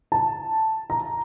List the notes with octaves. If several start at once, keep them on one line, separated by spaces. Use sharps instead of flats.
A5
A#5